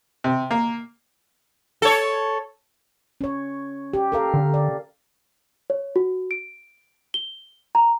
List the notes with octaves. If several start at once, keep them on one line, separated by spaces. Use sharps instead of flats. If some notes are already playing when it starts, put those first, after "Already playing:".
C3
A#3
A4 C#5
C#4 C#5
G4
A4 A#4 F5
D3
D5
C#5
F#4
D7
G7
A#5